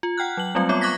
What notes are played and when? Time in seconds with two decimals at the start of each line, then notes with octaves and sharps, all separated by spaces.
0.03 F4
0.18 F#5 G5 F6 F#6
0.37 F#3 F#7
0.55 F#3 G3 A3 C4 F4
0.69 B3 F4 C#5 D6
0.81 C#6 D6 F#6 G#6 A#6 B6